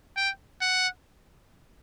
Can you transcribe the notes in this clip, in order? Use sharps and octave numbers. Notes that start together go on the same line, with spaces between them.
G5
F#5